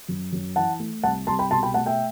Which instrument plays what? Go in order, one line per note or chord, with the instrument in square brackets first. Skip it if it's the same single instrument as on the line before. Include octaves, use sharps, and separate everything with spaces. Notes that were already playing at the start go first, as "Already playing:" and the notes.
[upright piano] F#2
F#2
E3 F#5 A5
A3
C2 F#5 A5
C2 A5 C6
G5 B5
B2 A5 C6
G5 B5
A3 F#5 A5
E5 G5